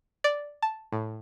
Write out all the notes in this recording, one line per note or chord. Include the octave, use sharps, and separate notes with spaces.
D5
A5
A2